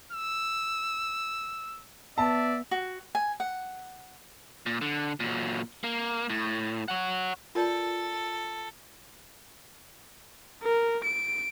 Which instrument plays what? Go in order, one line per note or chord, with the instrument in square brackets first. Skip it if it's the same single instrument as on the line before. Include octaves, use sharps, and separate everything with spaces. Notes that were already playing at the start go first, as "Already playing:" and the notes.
[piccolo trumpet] E6
[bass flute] B3 [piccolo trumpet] D5 [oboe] E5 [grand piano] A5
[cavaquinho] F#4
G#5
F#5
[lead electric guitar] A#2
D3
A#2 F#3
A#3
A2
C#5 F#5
[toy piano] F4 A#4 D5 [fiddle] A4
[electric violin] A#4
D7